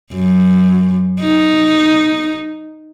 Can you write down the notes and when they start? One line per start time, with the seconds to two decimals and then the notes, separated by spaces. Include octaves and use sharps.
0.14 F#2
1.21 D#4